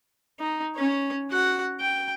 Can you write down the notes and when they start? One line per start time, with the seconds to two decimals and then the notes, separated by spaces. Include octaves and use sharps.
0.40 D#4
0.76 C#4 C#5
1.31 F#4 F#5
1.81 G5